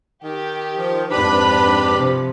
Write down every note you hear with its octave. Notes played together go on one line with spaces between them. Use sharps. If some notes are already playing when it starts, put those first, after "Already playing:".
D#3 G4
F3
F2 G#2 D4 G4 B4 B5
C3 F3